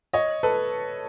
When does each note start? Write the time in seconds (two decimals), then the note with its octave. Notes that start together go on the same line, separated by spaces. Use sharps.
0.13 C#5 D#5
0.43 A4 B4